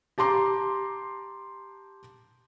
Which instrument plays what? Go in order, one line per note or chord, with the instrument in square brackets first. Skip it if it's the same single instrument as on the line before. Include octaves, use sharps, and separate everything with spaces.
[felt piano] G4 A5 A#5 C6 D6